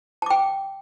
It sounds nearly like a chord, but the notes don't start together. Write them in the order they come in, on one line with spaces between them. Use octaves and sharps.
A5 D6 G5